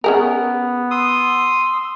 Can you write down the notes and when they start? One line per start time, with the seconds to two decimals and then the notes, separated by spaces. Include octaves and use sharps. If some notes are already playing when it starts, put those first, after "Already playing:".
0.04 B3 C#4 G#4 A#4
0.91 C6 D#6 E6